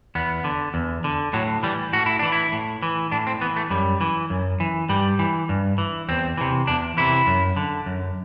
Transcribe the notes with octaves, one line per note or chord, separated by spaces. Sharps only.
E2 B3
D3
E2
D3
A2 F#3
E3 G3
A2 F#4
E4
E3 D4
E4
A2
E3
A2 D4
C4
E3 B3
A3
F#2 G3
E3
F#2
E3
G2 G3
E3
G2
E3
E2 C4
C3 E3
E2 D4
C3 E3 E4
F#2
D3
F#2